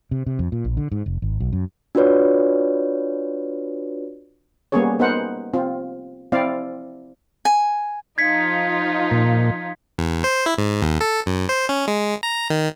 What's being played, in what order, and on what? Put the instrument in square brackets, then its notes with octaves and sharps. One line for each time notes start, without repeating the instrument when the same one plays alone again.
[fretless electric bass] C3
C3
F2
A#2
A#1
D3
G#2
F1
G#1
B1
F#2
[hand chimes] D4 F4 F#4 B4 C#5 D5
[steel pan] G3 A#3 B3 C#4 G#4 C#5
B3 D#4 A#4 C5 F#5
C4 F4
C4 E4 D5 F5
[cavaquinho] G#5
[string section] F3 D#4 F4 [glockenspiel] G#6 B6 C#7
[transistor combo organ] A#2 [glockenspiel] B6
[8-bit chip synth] E2
C5
E4
G#2
D#2
A4
F#2
C5
C#4
G#3
A#5
D#3